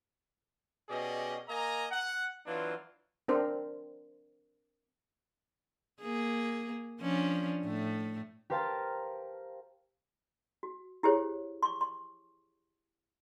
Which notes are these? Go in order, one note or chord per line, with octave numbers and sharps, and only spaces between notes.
B2 C#4 G4 G#4 D5 D#5
A#3 D#5 G#5 A#5
F#5
E3 F#3 B3 D4 F4
C4 D4 A#4 C5
A#3 G#4
F3 C#4 D4
A2 A3
G4 A#4 C5 F5 A5 A#5
F#4
E4 G4 G#4 C5 C#5
C6 C#6
C6